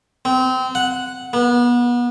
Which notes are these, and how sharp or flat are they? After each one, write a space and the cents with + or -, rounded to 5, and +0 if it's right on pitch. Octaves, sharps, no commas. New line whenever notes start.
C4 -25
F#5 -5
B3 -30